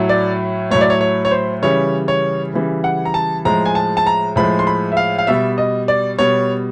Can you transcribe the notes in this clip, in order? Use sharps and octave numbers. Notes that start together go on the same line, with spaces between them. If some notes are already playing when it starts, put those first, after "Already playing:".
Already playing: A2 F#3 A3
D5
A2 F#3 A3 C#5
D5
C#5
C#5
C#5
C5
C#3 E3 G3 C#5
C#5
C#3 E3 G3
F#5
A#5
A5
A2 F3 G#3 A#5
G#5
A5
A5
A#5
A2 F3 G#3 B5
C6
B5
E5
F5
F5
B2 G3 E5
D#5
D5
B2 G3 C#5